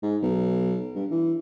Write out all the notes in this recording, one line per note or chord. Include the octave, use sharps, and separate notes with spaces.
G#2
B1
G2
E3